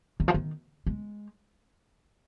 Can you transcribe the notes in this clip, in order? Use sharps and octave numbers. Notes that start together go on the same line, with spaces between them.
D#3
F3
D#3
G#3